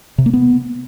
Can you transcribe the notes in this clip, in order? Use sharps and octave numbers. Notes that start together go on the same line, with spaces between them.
C3
A#3
B3